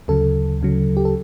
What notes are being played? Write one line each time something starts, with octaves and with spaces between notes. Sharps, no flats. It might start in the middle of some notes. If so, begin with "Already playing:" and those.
D2 C#3 F#3 A4
D2 C#3 F#3
G4
A4